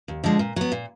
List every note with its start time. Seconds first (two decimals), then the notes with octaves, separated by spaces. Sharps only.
0.08 D#2
0.24 D3 F3 G#3
0.39 A#2
0.56 F#3 B3
0.72 A#2